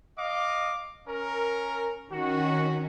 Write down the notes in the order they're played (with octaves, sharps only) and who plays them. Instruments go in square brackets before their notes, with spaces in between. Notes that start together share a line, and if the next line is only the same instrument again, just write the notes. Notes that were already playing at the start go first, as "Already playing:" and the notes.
[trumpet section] D#5 F5 D6
C#4 A#4
[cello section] D#3 C#4 [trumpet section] F#4